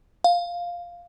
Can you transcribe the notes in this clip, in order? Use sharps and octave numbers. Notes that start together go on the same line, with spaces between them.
F5